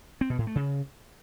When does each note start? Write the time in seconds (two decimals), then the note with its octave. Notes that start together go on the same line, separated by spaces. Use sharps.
0.21 C4
0.30 B2
0.38 A2
0.47 A3
0.56 C#3